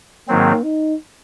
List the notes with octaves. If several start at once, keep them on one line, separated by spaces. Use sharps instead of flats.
G#2 D#3 F#3 A#3 C4
D#4